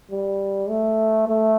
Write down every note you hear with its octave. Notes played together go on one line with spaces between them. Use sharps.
G3
A3
A3